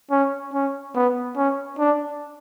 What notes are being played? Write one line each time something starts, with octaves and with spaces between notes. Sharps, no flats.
C#4
C#4
B3
C#4
D4